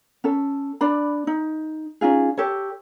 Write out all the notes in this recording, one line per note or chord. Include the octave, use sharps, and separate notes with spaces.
C#4 A4
D4 D5 B5
D#4
C#4 D#4 F4 G#4
G4 A4 C#5